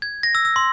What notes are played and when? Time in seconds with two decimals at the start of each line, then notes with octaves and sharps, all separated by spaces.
0.02 G#6
0.23 A#6
0.35 E6
0.45 E6
0.56 C6